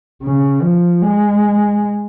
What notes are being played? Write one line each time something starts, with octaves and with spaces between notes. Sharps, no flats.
C#3
F3
G#3